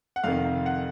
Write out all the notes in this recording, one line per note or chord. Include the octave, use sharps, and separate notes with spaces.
F#5
F2 C3 D#3 F5
F#5